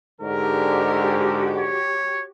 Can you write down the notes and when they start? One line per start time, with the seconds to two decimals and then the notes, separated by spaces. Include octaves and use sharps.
0.21 G#2 D3 F#4 G4 A#4
1.58 C#5